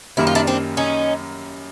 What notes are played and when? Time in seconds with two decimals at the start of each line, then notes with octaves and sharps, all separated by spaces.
0.17 F#2 D#3 G3 A#3 E4
0.27 F4
0.35 D4 E4
0.47 C4 D4
0.77 C#4 D#4